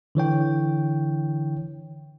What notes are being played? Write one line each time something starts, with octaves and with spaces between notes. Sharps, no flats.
D3 E3 C#5 G5